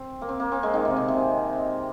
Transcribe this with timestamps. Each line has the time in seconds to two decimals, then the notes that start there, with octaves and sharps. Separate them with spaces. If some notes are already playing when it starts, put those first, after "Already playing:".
Already playing: C4
0.22 A#3
0.29 C4
0.40 A#3
0.52 C4
0.63 G#3
0.74 D#3
0.85 C3
0.97 C3
1.08 C3